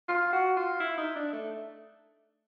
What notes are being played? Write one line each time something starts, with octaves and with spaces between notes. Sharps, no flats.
F4
F#4
F4
E4
D#4
D4
A3